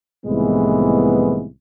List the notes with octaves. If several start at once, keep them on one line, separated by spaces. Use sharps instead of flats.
C2 A2 D#3 E3 G#3 B3